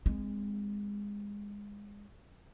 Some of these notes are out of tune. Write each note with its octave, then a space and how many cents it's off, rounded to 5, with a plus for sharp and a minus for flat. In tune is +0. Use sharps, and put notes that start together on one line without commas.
G#3 -25 C4 -20